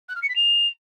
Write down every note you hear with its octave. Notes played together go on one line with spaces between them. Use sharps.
F#6
F6
C#7
B6
F7